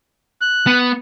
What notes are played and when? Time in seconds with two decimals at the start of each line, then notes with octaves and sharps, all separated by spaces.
0.41 F#6
0.67 B3